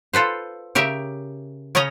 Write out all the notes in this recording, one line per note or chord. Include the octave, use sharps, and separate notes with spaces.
F4 A4 B4 C5
C#3 G4 A#4 E5
C#3 C#4 C#5 D#5 A#5